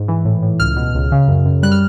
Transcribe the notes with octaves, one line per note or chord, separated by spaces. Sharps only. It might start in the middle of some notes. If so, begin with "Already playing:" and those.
Already playing: G#2
E3
A2
A2
C#2 F6
B2
C#2
C#3
F#2
F#2
G3 F#6
F6